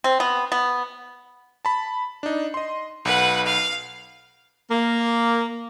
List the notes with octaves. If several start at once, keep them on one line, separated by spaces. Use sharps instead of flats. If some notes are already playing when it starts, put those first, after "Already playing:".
C4
B3
B3
A5 B5
D4 D#4
D#5 C6
B1 B4 F#5
F5
A#3